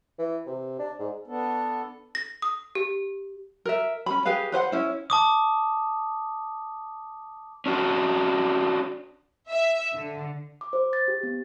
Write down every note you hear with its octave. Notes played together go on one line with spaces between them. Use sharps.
E3
C3
D4
G#2
B3 D4 A4
A#6
D#6
G4
A#4 E5
C#4 B5
G4 G#4 B4 F5
B4 C5 F5 F#5
C#4 E4
A5 D6 D#6
C#4 D4 F#4
E5
D3
D6
C5
A6
G4
B3